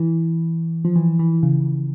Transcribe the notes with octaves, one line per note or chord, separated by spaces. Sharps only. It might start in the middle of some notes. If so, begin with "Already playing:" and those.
Already playing: E3
F3
E3
E3
C#3